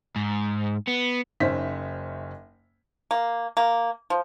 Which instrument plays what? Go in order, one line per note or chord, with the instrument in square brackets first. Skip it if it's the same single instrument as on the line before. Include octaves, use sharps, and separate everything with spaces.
[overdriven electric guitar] G#2
B3
[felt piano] F#1 C#4 D#4 C5 E5 B6
[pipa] A#3
A#3
F3